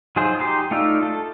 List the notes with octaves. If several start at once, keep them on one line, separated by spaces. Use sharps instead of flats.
F#3 D#4 F4 G#4 C5
D#4 G4 C6
A3 D#4 F4 D5 E5
A4